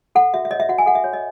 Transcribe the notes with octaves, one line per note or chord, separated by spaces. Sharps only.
A4 F#5
F#4 E5
E5
C#5 D#5
E5
F#4 F#5
G#5
A4 F#5
E5
F#4 C#5
D#5